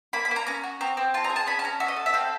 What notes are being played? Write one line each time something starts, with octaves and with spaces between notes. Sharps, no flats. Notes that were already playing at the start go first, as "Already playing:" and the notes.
A#3 B5
B5
A#3
A#5
C#4 A#5
F#4
C4 A#5
C4
F4 A5
A#5
G#4
A5
C#4 B5
A5
C#4 A#5
F#4 E5
D#5
A4
E5
C4 F5